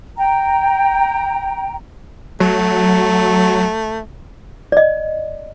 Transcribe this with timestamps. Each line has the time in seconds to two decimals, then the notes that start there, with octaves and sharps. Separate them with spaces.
0.17 G5 A#5
2.40 F#3 A3
4.72 D5 D#5